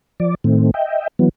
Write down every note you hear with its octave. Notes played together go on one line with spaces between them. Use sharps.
F3 D5
A2 D#3 A3 C4
D#5 E5 G5
E3 F#3 B3